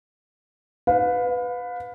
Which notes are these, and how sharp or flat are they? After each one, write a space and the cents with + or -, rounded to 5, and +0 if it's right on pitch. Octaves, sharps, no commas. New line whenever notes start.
B4 +15 F5 +35